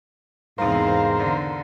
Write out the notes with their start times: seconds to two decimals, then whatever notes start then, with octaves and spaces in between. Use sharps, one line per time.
0.58 E2 G#2 C3 A#4 C5 F5
1.17 D3